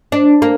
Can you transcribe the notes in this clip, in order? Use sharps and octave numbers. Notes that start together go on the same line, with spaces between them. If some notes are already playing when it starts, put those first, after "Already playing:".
D4
A#3